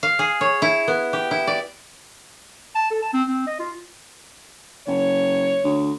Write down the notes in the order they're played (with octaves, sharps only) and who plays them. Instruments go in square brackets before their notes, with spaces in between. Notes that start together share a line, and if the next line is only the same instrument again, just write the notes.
[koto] F5
G#4
C#5
E4
B3
G4
E4
D5
[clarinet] A5
A4
A5
C4
C4
D#5
F4
[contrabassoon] F#1 [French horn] C#5
[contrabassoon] D2